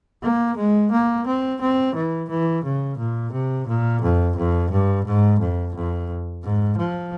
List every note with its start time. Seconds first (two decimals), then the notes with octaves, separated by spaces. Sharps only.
0.23 A#3
0.57 G#3
0.91 A#3
1.27 C4
1.61 C4
1.95 E3
2.29 E3
2.64 C#3
2.98 A#2
3.32 C3
3.67 A#2
4.02 F2
4.37 F2
4.71 G2
5.05 G#2
5.40 F2
5.75 F2
6.43 G#2
6.77 F3